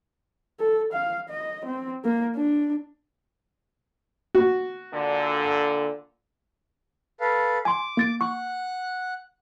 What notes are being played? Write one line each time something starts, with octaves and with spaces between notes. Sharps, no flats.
A4
F5
D#5
C4
A#3
D4
F#4
A#2 D3
A4 B4 F5
G#5 C6 D6
A#3 A6 D7
F#5 C#6 F#6